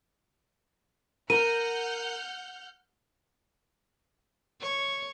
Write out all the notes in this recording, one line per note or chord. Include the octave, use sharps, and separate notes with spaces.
A#4 F#5 F6 G6 D#7
C#5